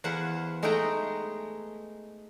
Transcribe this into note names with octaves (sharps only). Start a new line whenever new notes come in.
E2 B4 C5 F5 F#5
G#3 A3 D#4 B4 G5 A#5